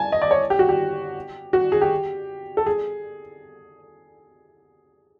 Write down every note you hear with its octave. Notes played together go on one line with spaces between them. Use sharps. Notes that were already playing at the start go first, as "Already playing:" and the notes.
Already playing: G#5 A5
D#5
D5
C#5
G4
F#4
G4
F#4
G#4
G4
A4
G#4